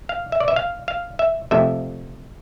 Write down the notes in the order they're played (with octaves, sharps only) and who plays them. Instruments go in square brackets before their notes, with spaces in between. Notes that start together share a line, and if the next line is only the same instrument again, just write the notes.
[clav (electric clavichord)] F5
E5
D5
E5
F5
F5
E5
F2 C3 F3 A3 E5